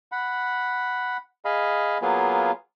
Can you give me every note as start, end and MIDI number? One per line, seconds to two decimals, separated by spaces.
0.12 1.17 78
0.12 1.17 83
1.45 1.98 68
1.45 1.98 75
1.45 1.98 77
1.45 1.98 83
2.02 2.51 54
2.02 2.51 58
2.02 2.51 59
2.02 2.51 65
2.02 2.51 68